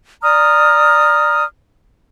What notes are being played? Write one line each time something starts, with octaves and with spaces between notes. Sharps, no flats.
D5 A#5 D#6 F6